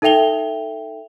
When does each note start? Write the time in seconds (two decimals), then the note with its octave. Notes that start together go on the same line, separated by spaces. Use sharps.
0.02 D#4 A4 E5 G5 F7 G7